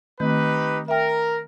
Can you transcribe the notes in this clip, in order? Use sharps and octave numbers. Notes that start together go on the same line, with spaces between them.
D#3 A3 C4 D#4 G4 B4
A#4 E5 G5